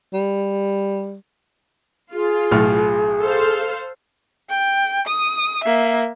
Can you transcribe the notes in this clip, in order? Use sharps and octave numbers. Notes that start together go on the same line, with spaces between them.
G3
F4 G#4
B1 A2 F6
A4 C5 F5
G5
D#6
A#3 E5